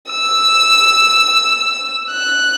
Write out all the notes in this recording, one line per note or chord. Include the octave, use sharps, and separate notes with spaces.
E6
F#6